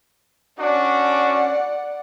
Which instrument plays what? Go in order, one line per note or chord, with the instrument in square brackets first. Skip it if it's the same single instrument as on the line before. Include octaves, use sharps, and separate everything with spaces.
[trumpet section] C#4 D4 F#4 [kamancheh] D5 F#5